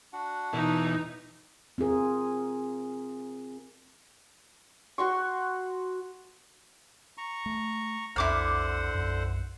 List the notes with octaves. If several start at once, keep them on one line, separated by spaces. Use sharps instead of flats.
D4 F#4 F#5
B2 E3 D#4
C4 F4 G#4 A#4
F#4 C6 C#6
A#5 C#6
A3
B1 F2 D3 E4 C5 F#5 D6 F6
B1 F#2